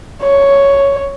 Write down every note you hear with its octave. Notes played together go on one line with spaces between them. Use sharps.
C#5